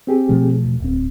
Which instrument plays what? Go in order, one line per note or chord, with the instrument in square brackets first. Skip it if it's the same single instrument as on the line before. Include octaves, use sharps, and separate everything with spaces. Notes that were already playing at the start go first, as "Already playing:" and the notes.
[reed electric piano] C4 G4 G#4
[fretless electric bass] B2 F3 A3
[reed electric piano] E2
[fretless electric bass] D1 C4